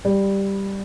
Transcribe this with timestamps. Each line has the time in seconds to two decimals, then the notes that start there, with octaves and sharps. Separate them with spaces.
0.05 G3